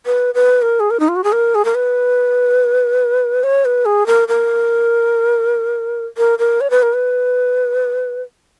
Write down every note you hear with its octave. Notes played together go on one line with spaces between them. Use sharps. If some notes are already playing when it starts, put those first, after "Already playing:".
B4
B4
A#4
G#4
A#4
D#4
F4
F#4
G#4
A#4
G#4
A#4
B4
C#5
B4
G#4
A#4
A#4
A#4
A#4
C#5
B4
A#4
B4